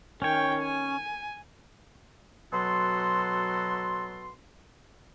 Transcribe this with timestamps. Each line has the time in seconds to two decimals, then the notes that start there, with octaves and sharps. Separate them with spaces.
0.22 D#3 C#4 C#5 G5
0.62 G#5
2.52 B2 F#3 F#4 A4 C6